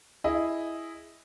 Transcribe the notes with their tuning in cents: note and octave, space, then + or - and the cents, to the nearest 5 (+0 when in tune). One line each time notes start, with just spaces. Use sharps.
E4 +0 G#4 +0 D#5 +0